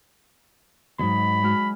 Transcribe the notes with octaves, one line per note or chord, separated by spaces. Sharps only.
D#2 G#2 F#3 D#4 B5
G#3 F#4 F6